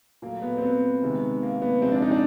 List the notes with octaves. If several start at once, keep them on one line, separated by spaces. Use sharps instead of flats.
A#2 F#3 A3 A#3
B3
C4
B3
C3 D#3 G#3
A#3
B3
C3 F3 G#3 C4
D4
D#4
D4